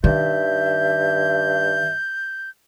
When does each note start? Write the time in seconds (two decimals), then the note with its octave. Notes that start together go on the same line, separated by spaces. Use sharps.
0.04 G2 D#3 E5 G6